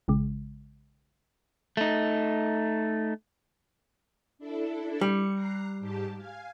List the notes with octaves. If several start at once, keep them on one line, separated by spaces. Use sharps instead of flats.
A#1 C#3 G#3
A3 D#4
D4 E4 A4
G3 C#7
A#5 F#6 C7
G#2 G4 A5
F5 G#5